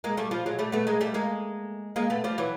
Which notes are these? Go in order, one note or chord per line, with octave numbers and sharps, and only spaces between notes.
G#3 A#3
G3 A3
F3 G3
F#3 G#3
G3 A3
A3 B3
G#3 A#3
G3 A3
G#3 A#3
G#3 A#3
A3 B3
F3 G3
E3 F#3